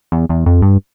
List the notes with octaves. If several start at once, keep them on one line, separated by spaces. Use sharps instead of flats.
E2
E2
F2
G2